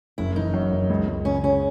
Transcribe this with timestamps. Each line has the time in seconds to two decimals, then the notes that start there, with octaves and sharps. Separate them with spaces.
0.18 F#1 E4
0.36 E3 D#4
0.54 F#2
0.72 F#1
0.90 C#2
1.08 C#2
1.25 C#3 C#4
1.44 C#3 C#4